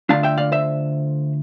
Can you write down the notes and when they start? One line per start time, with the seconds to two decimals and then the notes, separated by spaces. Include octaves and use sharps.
0.09 D3 A3 D4 F4 F5 A5
0.23 E5 G5
0.38 D5 F5
0.52 C5 E5